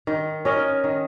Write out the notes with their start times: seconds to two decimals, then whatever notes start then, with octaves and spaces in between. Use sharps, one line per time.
0.07 D#3
0.45 C#4 A#4 D#5
0.84 D#3